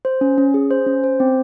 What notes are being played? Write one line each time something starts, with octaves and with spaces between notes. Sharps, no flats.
C5
C#4
C#4
G#4
C5
C#4
C5
C4